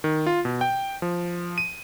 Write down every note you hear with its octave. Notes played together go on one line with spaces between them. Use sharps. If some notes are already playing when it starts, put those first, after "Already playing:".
D#3
F4
B2
G5
F3
D#7